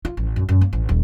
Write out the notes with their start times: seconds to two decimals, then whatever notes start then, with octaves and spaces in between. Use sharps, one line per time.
0.05 F4
0.17 A1
0.36 F#2
0.49 F#2
0.61 A#3
0.73 A1
0.89 D#1